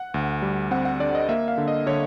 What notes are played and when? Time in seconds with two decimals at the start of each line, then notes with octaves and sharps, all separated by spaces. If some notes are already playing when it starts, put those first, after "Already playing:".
Already playing: F#5
0.14 D2
0.42 G3
0.71 C4 F#5
0.85 F#5
1.00 D3 D5
1.15 D#5
1.29 A#3 E5
1.48 F5
1.58 D3
1.68 D#5
1.86 D3 C#5